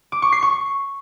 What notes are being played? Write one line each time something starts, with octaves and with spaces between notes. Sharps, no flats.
D6
C#6
C7
C#6